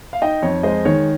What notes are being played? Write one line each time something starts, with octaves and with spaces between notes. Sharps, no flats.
F5
D#4 D#5 G5
F2 C#5
G#3 C5 D#5
D#3 C#5